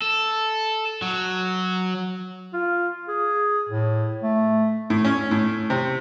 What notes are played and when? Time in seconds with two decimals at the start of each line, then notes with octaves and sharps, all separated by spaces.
0.02 A4
1.02 F#3
2.53 F4
3.08 G#4
3.69 A2
4.23 A3
4.90 A2
5.05 C#4
5.31 A2
5.70 C3